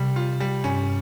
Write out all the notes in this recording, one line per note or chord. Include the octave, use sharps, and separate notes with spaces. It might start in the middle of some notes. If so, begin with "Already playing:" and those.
Already playing: C3 G3
F4
G3
G2 C#4